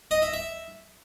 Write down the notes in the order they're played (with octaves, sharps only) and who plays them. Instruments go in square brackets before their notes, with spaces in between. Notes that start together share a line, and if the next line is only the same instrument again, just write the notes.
[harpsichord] D#5
E5
E5